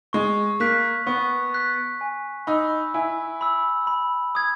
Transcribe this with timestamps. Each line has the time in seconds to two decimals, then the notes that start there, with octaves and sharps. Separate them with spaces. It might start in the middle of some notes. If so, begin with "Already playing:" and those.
0.13 G#3 C#6
0.60 A#3 F#6 B6
1.07 B3 C#6
1.54 F#6 B6
2.01 G#5
2.47 D#4 B5 E6
2.94 E4 G#5
3.41 B5 E6
3.87 B5
4.35 D#6 G#6